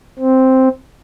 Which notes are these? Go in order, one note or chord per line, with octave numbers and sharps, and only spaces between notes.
C4